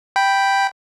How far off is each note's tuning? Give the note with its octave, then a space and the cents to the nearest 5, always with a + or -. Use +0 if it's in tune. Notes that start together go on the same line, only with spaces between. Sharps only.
G5 +0 B5 +0